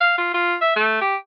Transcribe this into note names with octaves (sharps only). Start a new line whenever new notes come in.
F5
F4
F4
E5
A3
G4